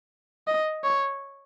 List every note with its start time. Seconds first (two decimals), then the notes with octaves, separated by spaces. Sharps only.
0.47 D#5
0.84 C#5